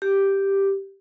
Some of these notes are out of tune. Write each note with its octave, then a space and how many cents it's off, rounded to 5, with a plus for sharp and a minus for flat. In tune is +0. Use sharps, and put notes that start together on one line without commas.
G4 +0